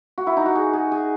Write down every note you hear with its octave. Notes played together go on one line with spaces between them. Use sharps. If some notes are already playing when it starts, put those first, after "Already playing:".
F#4
E4
D#4
F#4
G#4
G#4
G#4